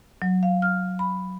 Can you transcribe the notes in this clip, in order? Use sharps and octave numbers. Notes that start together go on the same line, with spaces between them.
F#3
F5
F6
B5